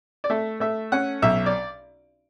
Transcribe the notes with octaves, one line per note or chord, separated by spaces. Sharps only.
D5
A3 E5
A3 E5
C#4 F#5
B1 E5
D5